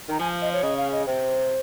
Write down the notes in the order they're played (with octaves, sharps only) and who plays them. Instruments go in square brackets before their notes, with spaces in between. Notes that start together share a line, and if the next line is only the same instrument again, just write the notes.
[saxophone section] D#3 [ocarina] A#5
[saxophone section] F3 [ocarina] G#5
[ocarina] D#5
C#5
[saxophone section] C#3 [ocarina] D#5
[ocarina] F5
D#5
[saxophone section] C3 [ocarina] C5